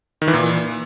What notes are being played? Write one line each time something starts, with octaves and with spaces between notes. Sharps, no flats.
D#3
E3
A#2